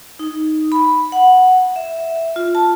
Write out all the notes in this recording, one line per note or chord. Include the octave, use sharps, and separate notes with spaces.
D#4
B5
F#5
E5
F4
A5